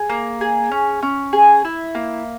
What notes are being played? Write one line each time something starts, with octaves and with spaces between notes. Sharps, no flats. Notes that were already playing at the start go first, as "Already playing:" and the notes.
Already playing: G#4
A#3
G#4
C#4
C#4
G#4
E4
A#3